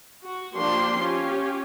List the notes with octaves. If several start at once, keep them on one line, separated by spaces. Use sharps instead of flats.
F#4
F3 A#3 D4 G4 C6
C#4 F4 G4